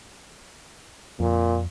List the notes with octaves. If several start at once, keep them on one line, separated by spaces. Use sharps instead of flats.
F2 A#2